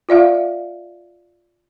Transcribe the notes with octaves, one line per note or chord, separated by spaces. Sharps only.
F4 D5 E5 F5